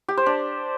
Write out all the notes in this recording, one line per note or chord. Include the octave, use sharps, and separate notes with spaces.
G4
C5
D4